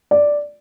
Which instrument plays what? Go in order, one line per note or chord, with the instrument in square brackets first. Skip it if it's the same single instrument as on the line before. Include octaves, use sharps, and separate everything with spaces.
[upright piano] D5